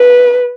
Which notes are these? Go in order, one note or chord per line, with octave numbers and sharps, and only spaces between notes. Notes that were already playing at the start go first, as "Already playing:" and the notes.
Already playing: B4